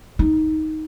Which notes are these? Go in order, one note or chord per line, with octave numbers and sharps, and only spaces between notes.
D#4